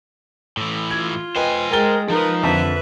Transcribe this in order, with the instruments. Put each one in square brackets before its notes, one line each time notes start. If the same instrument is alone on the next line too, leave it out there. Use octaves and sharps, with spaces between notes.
[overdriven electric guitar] A2 E3
[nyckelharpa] F4 [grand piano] G#6
[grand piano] B4 D#5 G5 [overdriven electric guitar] C5 G#5
[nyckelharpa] G#3 [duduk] A#4 [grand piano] G5 A6 G7
[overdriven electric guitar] F3 [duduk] D#4 [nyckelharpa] A#4 B4
[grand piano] F2 D3 A5 [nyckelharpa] B4 E5